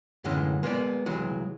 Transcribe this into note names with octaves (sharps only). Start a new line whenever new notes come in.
F#2 A2 D3 E3 G#3 C#4
G#3 A#3 B3 C#5 D5
C2 E3 F#3 G#3